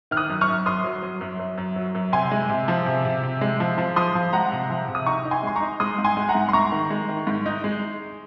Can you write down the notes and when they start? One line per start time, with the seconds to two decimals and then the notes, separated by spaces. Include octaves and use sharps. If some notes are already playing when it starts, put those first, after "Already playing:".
0.11 D#3 F6
0.17 D#6 F#6
0.29 F#2
0.41 C#6 F6
0.48 F#2
0.66 F#2 C6 D#6
0.84 F#3
1.02 F#3
1.21 F#2
1.39 F#2
1.58 F#2
1.76 F#3
1.95 F#2
2.12 C3 G#5 C6
2.31 G#3
2.50 C3
2.68 F3
2.86 C3
3.05 C3
3.23 C3
3.41 G#3
3.60 F3
3.78 F3
3.96 F3 C6 D#6
4.15 F3
4.33 G#3 F#5 A#5
4.52 C3
4.70 F3
4.88 C3
4.95 D#6
5.06 D#4 A#5 C#6
5.25 D#4
5.31 G#5 C6
5.43 G#3 C6
5.56 A#5 C#6
5.61 D#4
5.80 G#3 C6 D#6
5.98 G#2
6.05 G#5 C6
6.17 G#3
6.29 F#5 A#5
6.35 G#2
6.49 C6
6.53 G#2 A#5 C#6
6.72 D#3
6.90 G#3
7.09 D#3
7.27 G#2
7.46 D#4
7.64 G#3